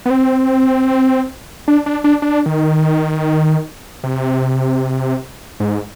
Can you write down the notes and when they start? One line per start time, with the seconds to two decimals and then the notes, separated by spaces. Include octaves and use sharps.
0.06 B3
0.10 C4
1.68 D4
1.86 D4
2.04 D4
2.22 D4
2.46 D#3
4.04 C3
5.60 G#2